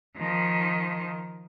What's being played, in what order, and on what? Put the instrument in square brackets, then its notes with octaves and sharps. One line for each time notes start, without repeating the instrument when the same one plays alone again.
[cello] D#3 F3